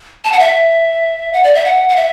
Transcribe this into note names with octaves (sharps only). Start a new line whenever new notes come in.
A5
F#5
E5
F#5
D5
E5
F#5
F#5
E5